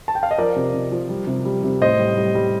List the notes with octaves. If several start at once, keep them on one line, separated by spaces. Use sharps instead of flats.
A5
G5
F5
D#5
F3 A#4 D5
C3
C3
F3
G3
C3
G3
C3
A2 C5 D#5
G3
G3
G3